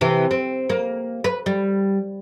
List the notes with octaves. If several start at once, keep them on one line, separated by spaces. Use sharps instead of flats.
C3 E3
C4
A#3
B4
G3